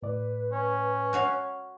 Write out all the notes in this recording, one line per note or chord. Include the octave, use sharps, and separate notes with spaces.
A2 B4 D5
C#4
F#4 C#5 F5